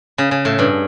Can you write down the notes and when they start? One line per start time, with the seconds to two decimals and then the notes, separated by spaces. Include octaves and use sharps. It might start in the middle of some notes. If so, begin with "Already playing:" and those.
0.18 C#3
0.31 C#3
0.45 A2
0.59 G2